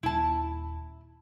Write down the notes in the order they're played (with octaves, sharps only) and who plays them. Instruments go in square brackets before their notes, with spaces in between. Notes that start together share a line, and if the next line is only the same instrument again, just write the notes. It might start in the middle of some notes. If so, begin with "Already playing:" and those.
[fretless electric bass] D#1 [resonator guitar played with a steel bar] E4 A5